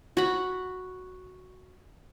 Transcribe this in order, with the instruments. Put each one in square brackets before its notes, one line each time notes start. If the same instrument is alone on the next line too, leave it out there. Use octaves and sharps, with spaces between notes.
[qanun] F#4 B5